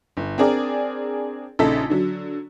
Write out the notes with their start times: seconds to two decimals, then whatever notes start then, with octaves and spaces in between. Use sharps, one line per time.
0.17 G1
0.38 C4 D4 G#4 A#4 D5
1.59 A#1 C#3 D#4 A4 A5 B6
1.90 D3 F#3